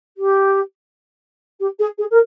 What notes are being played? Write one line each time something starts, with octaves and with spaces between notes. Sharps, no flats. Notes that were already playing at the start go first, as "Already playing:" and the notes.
G4
G4
G#4
G#4
A#4